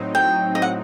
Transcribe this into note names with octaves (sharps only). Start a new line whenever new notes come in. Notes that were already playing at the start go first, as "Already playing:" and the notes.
Already playing: A2 F#3 C4 D#4
G5
D#5
F#5